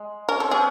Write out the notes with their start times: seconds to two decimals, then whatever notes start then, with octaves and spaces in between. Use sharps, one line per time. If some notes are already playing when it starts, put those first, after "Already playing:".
Already playing: G#3
0.29 C#4 A#4
0.40 C4 A4
0.51 B3 C#4 G#4